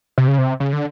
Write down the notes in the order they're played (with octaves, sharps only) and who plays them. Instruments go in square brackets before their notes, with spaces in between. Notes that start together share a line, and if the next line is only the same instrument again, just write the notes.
[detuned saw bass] C3
C#3
C3
C#3
D3